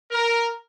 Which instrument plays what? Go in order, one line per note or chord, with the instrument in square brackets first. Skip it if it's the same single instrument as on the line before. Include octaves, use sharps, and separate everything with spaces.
[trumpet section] A#4